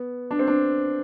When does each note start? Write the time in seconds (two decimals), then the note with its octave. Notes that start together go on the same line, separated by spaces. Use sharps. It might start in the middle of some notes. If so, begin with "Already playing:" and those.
Already playing: B3
0.31 D4
0.39 C4
0.48 D4